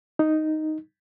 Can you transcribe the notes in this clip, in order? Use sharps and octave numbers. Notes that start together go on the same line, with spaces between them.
D#4